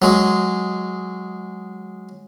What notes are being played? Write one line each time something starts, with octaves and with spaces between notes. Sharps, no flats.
F#3 G#3